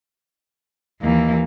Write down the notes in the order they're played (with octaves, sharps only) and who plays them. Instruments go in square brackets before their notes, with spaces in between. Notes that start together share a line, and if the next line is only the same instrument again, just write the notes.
[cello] D#2 E3 [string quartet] A#3